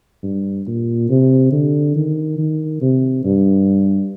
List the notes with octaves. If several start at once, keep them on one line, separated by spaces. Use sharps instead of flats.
G2
A#2
C3
D3
D#3
D#3
C3
G2